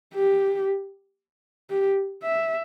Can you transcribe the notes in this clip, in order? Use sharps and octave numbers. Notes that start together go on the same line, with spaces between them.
G4
G4
E5